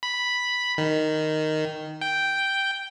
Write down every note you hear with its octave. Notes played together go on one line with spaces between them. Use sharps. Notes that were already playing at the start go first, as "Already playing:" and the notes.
B5
D#3
G5